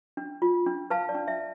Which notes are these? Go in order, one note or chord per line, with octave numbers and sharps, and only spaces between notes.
D4
F4
D4
B4 F5 A5
D5
D4
E5